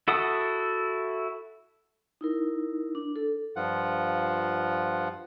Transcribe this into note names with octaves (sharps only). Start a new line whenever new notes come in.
E4 F#4 A4 F#5 D#6
D#4 E4 A#4
D4
A4
G2 F3 F4 F#5